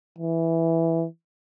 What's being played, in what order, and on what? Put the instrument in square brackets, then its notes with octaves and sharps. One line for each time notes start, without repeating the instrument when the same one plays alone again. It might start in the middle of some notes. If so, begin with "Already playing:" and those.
[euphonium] E3